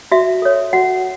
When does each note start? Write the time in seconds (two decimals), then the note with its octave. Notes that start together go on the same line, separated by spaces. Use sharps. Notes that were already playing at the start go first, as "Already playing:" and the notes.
0.12 F#4 E5
0.42 A4 C#5
0.73 F#4 F#5